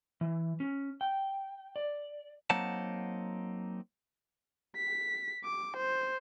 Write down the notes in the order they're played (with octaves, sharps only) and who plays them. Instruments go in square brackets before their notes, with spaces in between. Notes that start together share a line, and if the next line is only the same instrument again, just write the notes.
[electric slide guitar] E3
C#4
G5
D5
[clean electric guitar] F#3 A#3 C4 D#4 F#5 A5
[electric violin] B6
D6
C5